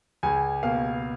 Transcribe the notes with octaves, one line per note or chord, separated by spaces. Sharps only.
C#2 G#5
B2 A#3 F5